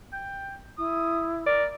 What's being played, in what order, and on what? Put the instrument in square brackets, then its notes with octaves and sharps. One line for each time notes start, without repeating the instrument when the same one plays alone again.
[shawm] G5
[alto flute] E4 [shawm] D#6
[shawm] A#4 [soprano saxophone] D5